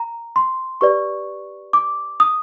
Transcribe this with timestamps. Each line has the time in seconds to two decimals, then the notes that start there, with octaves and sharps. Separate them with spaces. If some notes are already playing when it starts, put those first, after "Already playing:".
Already playing: A#5
0.36 C6
0.81 G4 B4 D5 C#6
1.73 D6
2.20 D#6